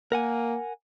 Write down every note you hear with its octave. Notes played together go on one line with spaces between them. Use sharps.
A#3 A#4 F#5 G#5